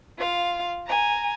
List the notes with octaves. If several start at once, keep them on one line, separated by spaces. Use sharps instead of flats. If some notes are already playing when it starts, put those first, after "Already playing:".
F4 F5
G#5 A#5